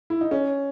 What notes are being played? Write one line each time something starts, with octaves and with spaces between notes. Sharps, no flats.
E4
D#4
C#4